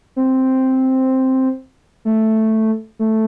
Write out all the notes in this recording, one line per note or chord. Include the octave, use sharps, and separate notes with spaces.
C4
A3
A3